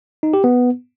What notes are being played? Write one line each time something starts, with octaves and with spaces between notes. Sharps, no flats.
D#4
G4
B3